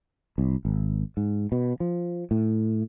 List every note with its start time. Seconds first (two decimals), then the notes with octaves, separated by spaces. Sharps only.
0.38 C2
0.65 G#1
1.17 G#2
1.52 B2
1.80 F3
2.31 A2